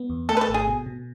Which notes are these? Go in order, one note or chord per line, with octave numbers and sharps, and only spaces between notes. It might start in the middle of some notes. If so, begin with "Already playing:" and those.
Already playing: B3
E2
A3 A4
B4
A4
G#1
G#4
B2
B2